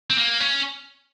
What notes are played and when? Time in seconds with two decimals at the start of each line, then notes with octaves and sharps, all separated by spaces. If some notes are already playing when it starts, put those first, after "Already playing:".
0.10 C4
0.18 A#3
0.40 C#4